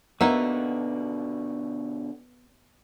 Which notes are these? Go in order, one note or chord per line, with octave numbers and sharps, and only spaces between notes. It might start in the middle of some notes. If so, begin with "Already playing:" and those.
B2 D3 A#3 B3 D#4 F#4 E5